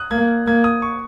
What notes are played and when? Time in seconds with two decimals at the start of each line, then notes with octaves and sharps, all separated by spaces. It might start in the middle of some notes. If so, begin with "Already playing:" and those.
Already playing: D#6 F#6
0.11 A#3 G#6
0.47 A#3 G#6
0.64 D#6
0.82 C#6